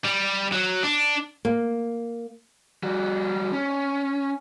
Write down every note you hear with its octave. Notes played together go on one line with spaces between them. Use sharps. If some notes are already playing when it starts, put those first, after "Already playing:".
G3
F#3
D4
A#3
G3 F#4
C#4